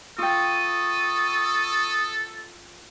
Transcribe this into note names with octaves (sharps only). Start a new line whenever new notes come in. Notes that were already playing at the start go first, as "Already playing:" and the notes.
F4 A4 G5 C#6 D#6